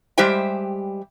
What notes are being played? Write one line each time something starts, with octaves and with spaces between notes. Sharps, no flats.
G3 G#3 G4 C5 E5 G5